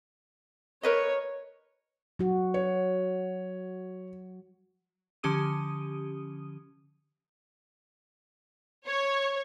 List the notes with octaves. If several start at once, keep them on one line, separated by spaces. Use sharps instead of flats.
A#4 B4 C#5 D#5
F#3 F#4
C#5
D3 F3 C#4 G4 D#6 D#7
C#5